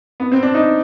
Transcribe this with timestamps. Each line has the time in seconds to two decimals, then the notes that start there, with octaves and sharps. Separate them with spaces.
0.20 B3
0.32 C4
0.43 D4
0.54 D#4